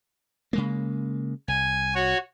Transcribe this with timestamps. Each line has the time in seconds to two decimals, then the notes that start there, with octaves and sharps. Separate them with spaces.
0.53 C#3 G#3 A#3
1.48 C2 G#5
1.95 F#4 C#5